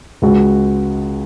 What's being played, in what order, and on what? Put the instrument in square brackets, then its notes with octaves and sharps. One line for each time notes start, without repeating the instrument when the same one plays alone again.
[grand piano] C#2 C#3 G#3 F#4